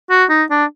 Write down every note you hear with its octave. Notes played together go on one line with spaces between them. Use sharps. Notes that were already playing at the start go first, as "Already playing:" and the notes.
F#4
D#4
D4